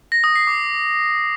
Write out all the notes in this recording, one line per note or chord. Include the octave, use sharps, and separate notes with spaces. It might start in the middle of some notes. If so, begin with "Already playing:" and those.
A#6
D#6
C7
D6